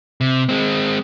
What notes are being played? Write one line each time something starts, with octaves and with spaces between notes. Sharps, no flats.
C3
G#3 C4